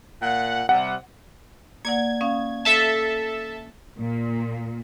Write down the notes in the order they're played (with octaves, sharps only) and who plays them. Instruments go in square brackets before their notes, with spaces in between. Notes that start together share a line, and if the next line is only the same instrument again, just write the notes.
[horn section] A#2 F#5
[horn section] C3 G3 [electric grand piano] F#5
[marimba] A#3 D5 F#5 [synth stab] G#6
[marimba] C#4 F5 D#6
[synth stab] A4 E5 A5
[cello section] A#2